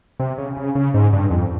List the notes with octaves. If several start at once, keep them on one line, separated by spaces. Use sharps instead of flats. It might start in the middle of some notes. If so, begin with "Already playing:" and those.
C3
C#3
C#3
C#3
G#2
G2
F2